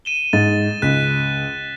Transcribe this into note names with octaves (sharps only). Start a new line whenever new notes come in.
D#7 E7 G7
G#2 A6
C#2 F#6 B6